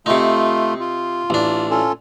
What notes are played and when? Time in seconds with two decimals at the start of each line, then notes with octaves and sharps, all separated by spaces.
0.06 C3 A3 D#4 F4
0.80 F4
1.30 A1 D4
1.71 C#4 F4 A4